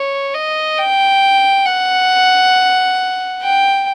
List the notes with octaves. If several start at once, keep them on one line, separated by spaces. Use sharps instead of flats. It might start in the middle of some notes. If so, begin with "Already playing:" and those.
Already playing: C#5
D#5
G5
F#5
G5